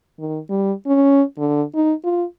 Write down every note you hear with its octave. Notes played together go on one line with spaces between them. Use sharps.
D#3
G3
C#4
D3
D#4
F4